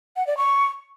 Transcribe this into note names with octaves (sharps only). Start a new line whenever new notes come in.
F#5
D5
C#6